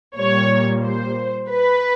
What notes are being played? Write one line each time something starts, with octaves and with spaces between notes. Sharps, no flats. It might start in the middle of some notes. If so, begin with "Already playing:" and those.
A#2 G3 A#3 C#5
C5
B4